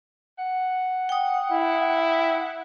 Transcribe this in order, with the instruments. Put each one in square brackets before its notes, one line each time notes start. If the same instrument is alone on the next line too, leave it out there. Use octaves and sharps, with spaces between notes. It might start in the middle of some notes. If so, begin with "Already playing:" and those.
[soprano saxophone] F#5
[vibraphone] G5 D#6
[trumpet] E4